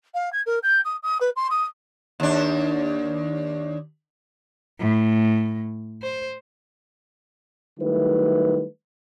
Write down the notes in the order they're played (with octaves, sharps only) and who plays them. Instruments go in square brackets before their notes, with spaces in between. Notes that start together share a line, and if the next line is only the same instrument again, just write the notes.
[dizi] F5
G#6
A#4
G6
D#6
D#6
B4
C6
D#6
[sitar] D#2 D4
[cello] A2
C5
[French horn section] D#3 F#3 G3 A3 E4 B4